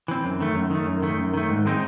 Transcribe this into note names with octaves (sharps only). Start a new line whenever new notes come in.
E3 C4
F#2
D#3 A3
F#2
D#3 A3
F#2
D#3 A3
F#2
D#3 A3
G#2
D#3 G#3 C4 D#4